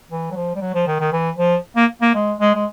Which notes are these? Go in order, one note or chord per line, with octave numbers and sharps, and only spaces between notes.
E3
F#3
F3
G3
F#3
F3
D#3
D#3
E3
F3
A#3
A#3
G#3
G#3
G#3